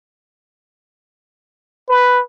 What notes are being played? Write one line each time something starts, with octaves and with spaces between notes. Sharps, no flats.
B4